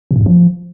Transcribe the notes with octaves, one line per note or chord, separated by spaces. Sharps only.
B2
A2
G2
F3